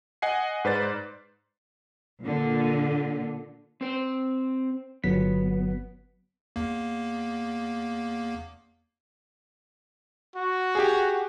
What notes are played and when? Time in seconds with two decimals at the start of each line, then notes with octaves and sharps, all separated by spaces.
0.22 D#5 F#5 G#5 C7
0.64 G#2 B4 C5 D5 A6
2.20 A#2 D3
3.81 C4 C5
5.04 G1 F#3 B3 B6
6.56 E2 A#3
10.36 F#4
10.75 G4 G#4